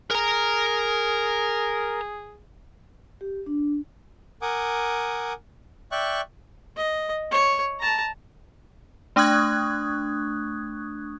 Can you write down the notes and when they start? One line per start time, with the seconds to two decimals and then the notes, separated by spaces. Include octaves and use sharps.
0.11 G#4 A#4 A#5
3.21 G4
3.46 D4
4.42 A#4 F#5 G#5 D6 D#6
5.92 D5 E5 G5 C#6 F#6
6.77 D#5
7.31 C#5
7.80 A5 A#5
9.16 A3 D4 C#6 D#6 F#6 G#6